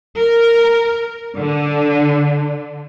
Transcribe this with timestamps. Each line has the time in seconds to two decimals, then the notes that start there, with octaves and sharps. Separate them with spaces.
0.19 A#4
1.38 D3